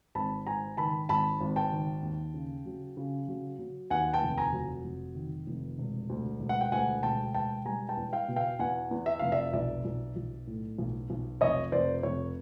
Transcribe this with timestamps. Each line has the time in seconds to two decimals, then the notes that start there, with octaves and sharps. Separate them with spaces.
0.15 G#1 A5 B5
0.47 G#2 G#5 A#5
0.77 D#3 A5 B5
1.09 G#1 A5 B5
1.40 G#1
1.56 G5 A5
1.72 D#3
2.03 D#2
2.34 C#3
2.66 F#3
2.97 C#3
3.28 F#3
3.59 F#3
3.90 D#2 F#5 G#5
4.13 G5 A5
4.22 F1
4.38 G#5 A#5
4.53 F#3
4.84 F1
5.15 D#3
5.47 F1
5.78 E1
6.09 D2
6.40 E1
6.49 F#5
6.61 G5
6.72 D2 F#5 G#5
7.03 E1 G5 A5
7.34 E1 G5 A5
7.65 G3 G#5 A#5
7.89 G5 A5
7.97 E2
8.13 F5 G5
8.28 B2
8.36 F5 G5
8.59 E2 F#5 G#5
8.91 E2
9.06 E5
9.19 F1 F5
9.32 D5 E5
9.53 B1 D5 E5
9.85 B1
10.16 B1
10.47 A2
10.78 B1
11.10 B1
11.41 F1 C#5 D#5
11.72 F1 C5 D5
12.03 F1 C#5